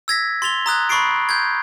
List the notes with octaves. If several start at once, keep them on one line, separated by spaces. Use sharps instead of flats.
E6 G#6 A#6 B6
C6 A6 F7 G7
A#5 D#6 F#6 G#6
B5 C#6 A6 C7 D7
G6 G#6